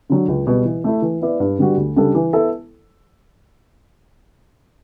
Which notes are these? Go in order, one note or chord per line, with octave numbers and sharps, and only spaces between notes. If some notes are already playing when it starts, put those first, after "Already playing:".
D3 F#3
C#2
B2 G3
E3
A3 E4
E3
B3 E4 B4 D5
G2
D3 G3 B3 F#4
D2
C#3 G3 D4 A4
E3
B3 E4 A4